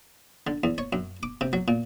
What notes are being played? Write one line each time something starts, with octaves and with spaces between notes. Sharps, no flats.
D3
E2
C#5
F#2
D6
C3
F#3
A#2